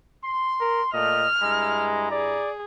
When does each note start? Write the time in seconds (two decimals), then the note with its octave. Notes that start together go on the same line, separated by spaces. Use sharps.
0.24 C6
0.60 A#4
0.93 A#2 A3 D#5 F6
1.42 G2 G#3 E4 A#5
2.11 G#4 D5